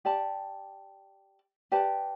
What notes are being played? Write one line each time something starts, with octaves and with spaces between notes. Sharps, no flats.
G4 D5 A5
G4 B4 D5 A5